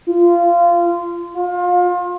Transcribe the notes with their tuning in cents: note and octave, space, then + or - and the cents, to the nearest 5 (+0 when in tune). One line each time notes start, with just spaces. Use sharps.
F4 -20
F4 +30